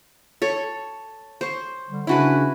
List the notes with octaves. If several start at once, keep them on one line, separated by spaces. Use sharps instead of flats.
A4 C#5 C#6
C5 C#6
D3 G3
C#3 C#4 D4 E4 F#4 B4